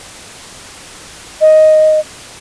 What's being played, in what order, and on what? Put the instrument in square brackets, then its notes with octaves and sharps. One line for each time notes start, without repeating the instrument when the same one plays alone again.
[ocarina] D#5